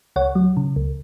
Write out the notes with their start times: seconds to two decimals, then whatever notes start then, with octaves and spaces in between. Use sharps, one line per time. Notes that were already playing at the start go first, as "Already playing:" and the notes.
0.16 C#2 C#5 F#5
0.35 F#3
0.57 C#3
0.76 C#2